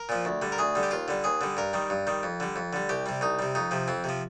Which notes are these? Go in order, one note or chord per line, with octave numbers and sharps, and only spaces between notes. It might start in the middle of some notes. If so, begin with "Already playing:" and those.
Already playing: A#4
A#2 F3
D2
D3 G3
A#4
D2 G#4
D3 G3
G4
D#2 F4
D3 G3
D#2 G#4
D3 G3
G2 A#4
D#3 G3
G2
D#3 G3
F2
D3 G3
F2
D3 G3
C2 G4
C3 G3
C2 D#4
C3 G3
F2 D#4
C3 F3
F2 C4
C3 F3